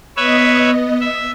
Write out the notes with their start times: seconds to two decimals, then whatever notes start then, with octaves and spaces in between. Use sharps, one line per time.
0.17 B3 B4 C#5 D#5 E5
1.01 E5